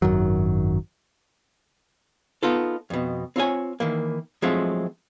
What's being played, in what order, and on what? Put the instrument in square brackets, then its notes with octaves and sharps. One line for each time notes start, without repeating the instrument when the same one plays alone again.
[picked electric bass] G#1 F#2 D#3 F#3
[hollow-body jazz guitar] B3 D#4 F4 A4
F2 B2
C4 F4 C#5 G#5
D#3 E3 A#3
F3 F#3 G#3 A3 C4 F4